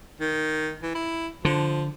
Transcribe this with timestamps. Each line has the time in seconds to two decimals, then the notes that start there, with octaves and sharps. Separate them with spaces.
0.20 D#3
0.82 E3
0.95 E4
1.45 D3 F3